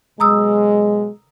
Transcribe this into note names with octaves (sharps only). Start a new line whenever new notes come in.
B2 F#3 G#3 A#5 D#6 E6